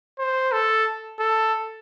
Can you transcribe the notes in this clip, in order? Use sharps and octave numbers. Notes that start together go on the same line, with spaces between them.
C5
A4
A4